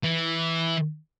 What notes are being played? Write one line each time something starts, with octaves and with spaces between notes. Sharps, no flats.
E3